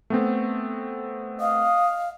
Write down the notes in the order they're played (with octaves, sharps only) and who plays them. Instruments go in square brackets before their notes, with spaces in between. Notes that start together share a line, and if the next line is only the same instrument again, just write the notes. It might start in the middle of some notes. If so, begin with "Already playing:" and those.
[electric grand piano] A3 B3 C4
[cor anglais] D#5 [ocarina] F5